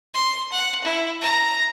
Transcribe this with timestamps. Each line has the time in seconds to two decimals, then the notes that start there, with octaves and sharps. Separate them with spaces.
0.14 C6
0.52 F#5
0.84 E4
1.21 A#5